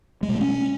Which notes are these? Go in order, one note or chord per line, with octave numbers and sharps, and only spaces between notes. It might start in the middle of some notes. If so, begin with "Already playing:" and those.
G#3
B2
A3
C#4